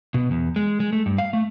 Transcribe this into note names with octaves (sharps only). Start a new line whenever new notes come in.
B2
E2
G#3
G#3
A3
G2
F5
A3